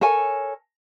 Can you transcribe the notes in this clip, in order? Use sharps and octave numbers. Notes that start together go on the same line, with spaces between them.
A4 A#4 C#5 G#5